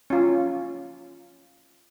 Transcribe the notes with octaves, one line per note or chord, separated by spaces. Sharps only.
C#4 F4